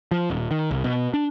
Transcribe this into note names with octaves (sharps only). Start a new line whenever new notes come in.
F3
D#1
D#3
C2
B2
D4